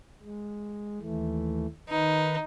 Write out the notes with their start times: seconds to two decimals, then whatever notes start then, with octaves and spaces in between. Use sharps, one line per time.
0.22 G#3
1.00 D#2 E3 A3
1.89 D#3 D#4 B4